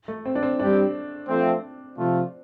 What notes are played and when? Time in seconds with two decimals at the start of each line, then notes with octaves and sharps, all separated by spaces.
0.08 A3
0.26 C4
0.35 D4
0.43 C4
0.59 G2 G3 C4 D4 G4
1.28 F3 A3 C4
1.95 C3 F3 A3 F4